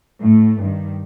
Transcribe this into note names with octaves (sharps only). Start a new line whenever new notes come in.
A2 A3
G2 D#3 G3